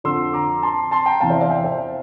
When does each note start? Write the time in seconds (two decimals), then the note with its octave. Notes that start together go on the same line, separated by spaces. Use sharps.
0.04 F2 D3 F3 C6 E6
0.33 A#5 D6
0.63 A5 C6
0.91 A5 C6
1.06 G5 A#5
1.20 E2 C3 E3 F5 A5
1.30 C5 E5
1.41 D5 F5
1.50 E5 G5
1.64 C5 E5